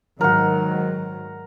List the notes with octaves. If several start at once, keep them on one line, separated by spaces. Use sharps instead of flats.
G#2 D#3 F#3 A#4 F#5